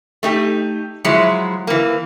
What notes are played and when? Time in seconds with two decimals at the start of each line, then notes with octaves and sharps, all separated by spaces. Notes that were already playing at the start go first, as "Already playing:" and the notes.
0.23 A3 D#4 G4
1.04 F3 F#3 G#3 E4
1.67 E3 A#3